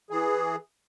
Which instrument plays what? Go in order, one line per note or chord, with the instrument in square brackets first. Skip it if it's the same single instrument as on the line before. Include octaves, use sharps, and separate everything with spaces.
[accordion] E3 G#4